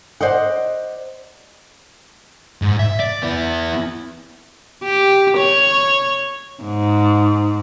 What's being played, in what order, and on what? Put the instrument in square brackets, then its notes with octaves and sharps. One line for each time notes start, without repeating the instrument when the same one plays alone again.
[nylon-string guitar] C5 D5 D#5 F#5
[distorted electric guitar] G#2
E5
D5
B3 E4
[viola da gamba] G4
C#5
G#2